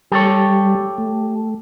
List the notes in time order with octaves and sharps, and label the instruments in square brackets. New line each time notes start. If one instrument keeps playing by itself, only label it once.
[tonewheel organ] G3 [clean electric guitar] G4 A4 C#5
[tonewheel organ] A3